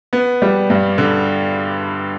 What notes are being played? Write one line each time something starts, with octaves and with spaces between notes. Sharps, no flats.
B3
G3
G2
D3